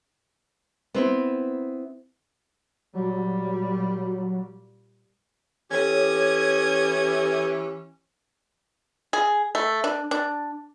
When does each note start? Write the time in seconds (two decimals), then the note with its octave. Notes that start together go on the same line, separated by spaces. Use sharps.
0.94 B3 C4 E4
2.95 A#2 F#3 G3
5.71 E3 C#4 G4 A4 C#5 D#6 G#6
9.13 G#4
9.55 A3
9.84 D4
10.11 D4